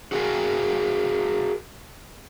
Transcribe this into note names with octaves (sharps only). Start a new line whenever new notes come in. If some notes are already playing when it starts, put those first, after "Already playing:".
F#4 G#4 A#4 B4 F5 G#5